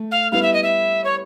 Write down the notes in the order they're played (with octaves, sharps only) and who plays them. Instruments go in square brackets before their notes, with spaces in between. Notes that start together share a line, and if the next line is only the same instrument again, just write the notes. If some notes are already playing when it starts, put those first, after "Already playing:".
Already playing: [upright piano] A3
[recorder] F5
[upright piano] G3 B3 E4 [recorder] F5
[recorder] E5
D#5
E5
C#5